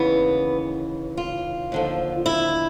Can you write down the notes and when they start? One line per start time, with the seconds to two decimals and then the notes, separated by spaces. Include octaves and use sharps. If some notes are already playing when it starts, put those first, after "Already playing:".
Already playing: D#2 C#3 E3 B3
1.17 F4
1.72 D#2 D3 F3
2.26 E4